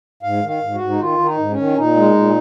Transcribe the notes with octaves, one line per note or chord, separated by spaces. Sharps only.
G#2 F5
D#3
F5
G#2
F#4
G#2
D#4
D#3 F4
D#3
D#4
G#2
C#4
D#3
A#2 D#4
G#3
A#2